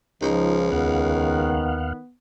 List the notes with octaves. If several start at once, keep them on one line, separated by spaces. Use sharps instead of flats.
C#2 F3 D#4
D#2 D#3 B3 F5 F#5